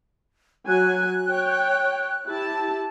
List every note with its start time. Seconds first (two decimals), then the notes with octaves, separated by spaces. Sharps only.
0.67 F#3 G#5 F#6
1.30 C#5 G5
2.27 E4 G4 A5